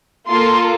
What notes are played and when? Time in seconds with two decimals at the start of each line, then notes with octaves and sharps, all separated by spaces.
0.29 A#3 F4 A4 C6